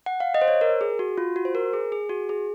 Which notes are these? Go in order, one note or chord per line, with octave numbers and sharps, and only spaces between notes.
F#5
F5
D#5
C5
C#5
A#4
G#4
F#4
F4
F#4
C5
A#4
G#4
G#4
F#4
G#4